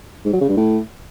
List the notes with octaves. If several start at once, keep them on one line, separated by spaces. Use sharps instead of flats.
G#2
F#3
C#3
G2
A2